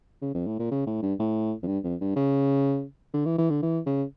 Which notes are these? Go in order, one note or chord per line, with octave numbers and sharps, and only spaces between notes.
C#3
F2
A2
A#2
C#3
A2
G2
A2
F2
G2
F2
G2
C#3
D3
E3
E3
D3
E3
C#3